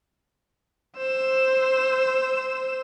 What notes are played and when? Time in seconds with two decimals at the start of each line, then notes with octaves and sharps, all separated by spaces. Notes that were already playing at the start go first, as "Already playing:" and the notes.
0.97 C5 E6